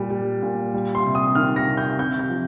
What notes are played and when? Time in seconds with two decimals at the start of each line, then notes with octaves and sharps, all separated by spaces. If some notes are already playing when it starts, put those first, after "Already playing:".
Already playing: A#2 G3
0.10 G3
0.43 A#2
0.74 G3
0.95 C6
1.05 C3
1.15 D#6
1.35 D#3 F6
1.56 A#6
1.68 C3
1.77 G6
1.98 C3 G6
2.19 G6
2.29 F3